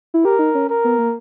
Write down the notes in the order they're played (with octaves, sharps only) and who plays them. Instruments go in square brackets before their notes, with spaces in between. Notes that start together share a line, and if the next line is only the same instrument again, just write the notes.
[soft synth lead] E4
[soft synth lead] G4 [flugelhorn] A#4
[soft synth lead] D#4
C#4
[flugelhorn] A#4
[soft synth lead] B3
A#3